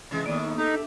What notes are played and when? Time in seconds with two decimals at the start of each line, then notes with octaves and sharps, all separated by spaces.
0.11 C3 E3 G#3
0.26 A2 D#3 A#3 B3 D5 D#6
0.44 D#4
0.58 D#4 G4 A4
0.71 D4 E5